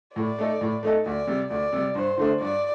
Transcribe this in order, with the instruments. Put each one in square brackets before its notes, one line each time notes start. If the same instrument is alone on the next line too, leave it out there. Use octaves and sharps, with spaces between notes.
[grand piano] A2 [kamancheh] D5
[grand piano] A3 D#4 A4
A2
A3 D#4 A4
[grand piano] D2 [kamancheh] D5
[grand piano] C3 G3
[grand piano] D2 [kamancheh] D5
[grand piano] C3 G3
[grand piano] G2 [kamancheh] C5
[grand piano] D3 A3 D4
[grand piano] G2 [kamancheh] D5